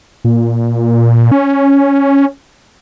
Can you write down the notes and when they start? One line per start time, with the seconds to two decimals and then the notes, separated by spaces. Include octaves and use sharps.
0.24 A#2
1.32 C#4